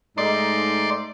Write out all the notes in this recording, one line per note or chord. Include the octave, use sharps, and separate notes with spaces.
G#2 A3 D#4 D5 C6